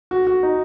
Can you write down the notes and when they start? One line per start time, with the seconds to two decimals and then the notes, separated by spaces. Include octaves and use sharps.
0.11 F#4
0.27 F#4
0.43 D#4